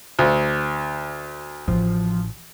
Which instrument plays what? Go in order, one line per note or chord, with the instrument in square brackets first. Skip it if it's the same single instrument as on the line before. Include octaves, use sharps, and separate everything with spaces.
[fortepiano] D2
[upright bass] A1 [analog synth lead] F3